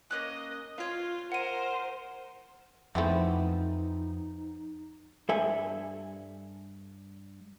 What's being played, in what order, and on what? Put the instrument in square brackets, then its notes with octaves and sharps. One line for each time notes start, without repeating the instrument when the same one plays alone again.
[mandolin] A#3 C#4 F#6 [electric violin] D#5
[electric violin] F4 [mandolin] C#5 F5
[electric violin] A#4 [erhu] C5 [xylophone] F#5 D#7
[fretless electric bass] F2 [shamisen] E3 A3 [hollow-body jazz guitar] F3 B3 C4 [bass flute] D#4
[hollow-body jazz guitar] G2 A4 E5 G#5